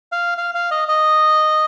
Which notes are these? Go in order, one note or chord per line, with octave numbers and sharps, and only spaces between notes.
F5
F5
F5
D#5
D#5